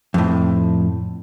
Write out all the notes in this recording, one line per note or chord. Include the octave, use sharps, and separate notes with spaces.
F2 A2